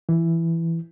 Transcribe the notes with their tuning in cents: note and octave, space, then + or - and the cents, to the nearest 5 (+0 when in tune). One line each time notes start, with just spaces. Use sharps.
E3 +10